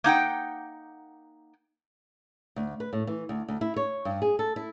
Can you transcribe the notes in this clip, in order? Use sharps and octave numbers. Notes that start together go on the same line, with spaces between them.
A#3 D#4 F#5 G5
D2
B4
A2
E3
D2
D2
E4
C#5
G2
G#4
A4
E4